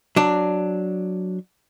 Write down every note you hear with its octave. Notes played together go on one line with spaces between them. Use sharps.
F#3 D4